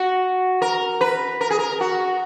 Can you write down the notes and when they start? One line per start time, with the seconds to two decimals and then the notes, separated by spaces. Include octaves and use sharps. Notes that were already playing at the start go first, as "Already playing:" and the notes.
Already playing: F#4
0.62 A#4
1.01 B4
1.41 A#4
1.50 G#4
1.59 A#4
1.81 F#4